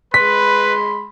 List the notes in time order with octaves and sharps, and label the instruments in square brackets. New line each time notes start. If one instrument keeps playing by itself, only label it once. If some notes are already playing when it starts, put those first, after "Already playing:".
[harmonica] G#3 B5 C6 [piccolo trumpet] B4 [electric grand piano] B6